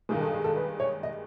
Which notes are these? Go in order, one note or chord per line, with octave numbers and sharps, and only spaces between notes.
G2 D#3 G#3 A#4
A4
G#4
A4
B4
C#5
D#5